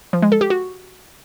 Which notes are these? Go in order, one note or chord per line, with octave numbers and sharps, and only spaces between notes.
F3
G#3
A4
G4
F#4